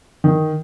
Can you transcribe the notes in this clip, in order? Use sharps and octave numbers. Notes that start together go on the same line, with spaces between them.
D#3